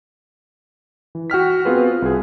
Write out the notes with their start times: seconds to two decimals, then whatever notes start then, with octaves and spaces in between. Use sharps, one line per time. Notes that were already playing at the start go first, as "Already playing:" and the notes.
1.15 E3
1.30 F#4 G5 F6 B6
1.65 B3 C4 F4 F#4 G#4 B4
2.02 C2 G#4